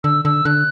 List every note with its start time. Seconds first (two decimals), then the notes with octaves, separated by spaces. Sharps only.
0.04 D3 E6
0.25 D3 E6
0.45 D3 F#6